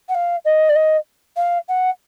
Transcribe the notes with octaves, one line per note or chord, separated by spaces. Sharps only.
F#5
F5
D#5
D5
D#5
F5
F#5